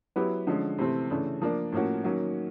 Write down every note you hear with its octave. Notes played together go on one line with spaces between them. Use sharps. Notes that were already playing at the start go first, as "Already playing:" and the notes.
F#3 B3 E4 G4 B4
D3 F3 G#3 C#4
C3 E3 A3 C4
C#3 E3 A3 D4
F3 A#3 D4
A2 F3 A#3 C#4 F#4
D#3 F#3 A#3 C#4 F#4